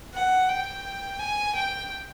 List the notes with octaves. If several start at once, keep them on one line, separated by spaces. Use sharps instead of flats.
F#5
G5
G#5
G5